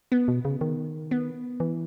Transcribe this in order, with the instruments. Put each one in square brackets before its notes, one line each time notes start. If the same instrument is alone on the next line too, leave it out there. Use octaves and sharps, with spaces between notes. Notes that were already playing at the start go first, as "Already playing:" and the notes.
[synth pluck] B3
[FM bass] B2
C#3
D#3
[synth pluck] B3
[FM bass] E3